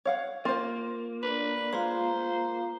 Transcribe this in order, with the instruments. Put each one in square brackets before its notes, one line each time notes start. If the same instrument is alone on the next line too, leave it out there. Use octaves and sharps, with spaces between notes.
[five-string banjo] C#5 F5 F#5
[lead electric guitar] A#3 [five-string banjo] F4 C5
[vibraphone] D4 D5 [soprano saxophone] B4
[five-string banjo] G#3 [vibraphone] F4 F5 A#5 [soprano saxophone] C5